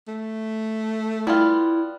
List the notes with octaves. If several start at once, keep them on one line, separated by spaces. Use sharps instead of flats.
A3
G3 B3 E4 F4